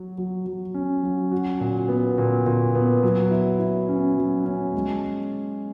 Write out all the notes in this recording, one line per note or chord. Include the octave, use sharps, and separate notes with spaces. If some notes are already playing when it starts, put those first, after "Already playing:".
Already playing: F#3 F#4
F#3
F#3
C#4
F#3
F#4
A#2
B3
A#2
A#2
B3
F#3
E4
E4
C#4
F#3
C#4
G#3